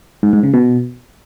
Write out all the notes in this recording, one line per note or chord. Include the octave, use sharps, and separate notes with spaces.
G#2
G#2
C#3
B2